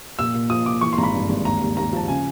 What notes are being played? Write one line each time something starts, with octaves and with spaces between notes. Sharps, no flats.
A#2 E6
A#2
F3 D#6
A#2 D6
E3 C#6
C6
G#1 A#5
B5
G2
G#1
D#2 A#5
D#2
D#2 A#5
F3 A5
C#3 G#5